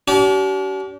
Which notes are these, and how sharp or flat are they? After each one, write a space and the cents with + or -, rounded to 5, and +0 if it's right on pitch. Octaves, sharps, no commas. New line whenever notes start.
D4 -45 G4 -40